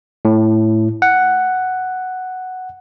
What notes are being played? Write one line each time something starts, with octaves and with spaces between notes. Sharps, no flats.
A2
F#5